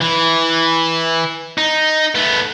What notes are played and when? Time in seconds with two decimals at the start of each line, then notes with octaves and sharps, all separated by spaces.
0.01 E3
1.58 D#4
2.15 A3 B3